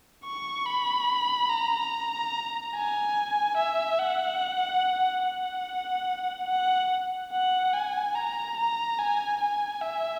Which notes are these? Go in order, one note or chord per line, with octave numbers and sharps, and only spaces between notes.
C#6
B5
A#5
G#5
E5
F#5
F#5
F#5
F#5
G#5
A#5
A#5
G#5
G#5
E5